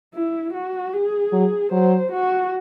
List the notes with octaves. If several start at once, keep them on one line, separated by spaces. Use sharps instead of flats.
E4
F#4
G#4
F#3
F#3 C5
F#4